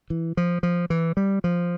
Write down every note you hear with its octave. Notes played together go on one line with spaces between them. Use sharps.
E3
F3
F3
E3
G3
F3